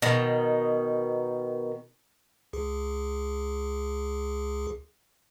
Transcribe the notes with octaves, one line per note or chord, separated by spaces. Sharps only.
B2 D#3
C#2 G#4